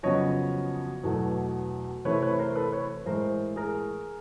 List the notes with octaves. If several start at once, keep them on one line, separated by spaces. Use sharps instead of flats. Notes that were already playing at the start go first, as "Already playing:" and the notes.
F2 C#3 F#3 B3 C#5 D#5
E2 B2 F#3 A3
C3 E3 A3 C4 B4 C#5
B4 C#5
A#4 C5
A4 B4
B4 C#5
A2 E3 G#3 A#4 C5
G#4 A#4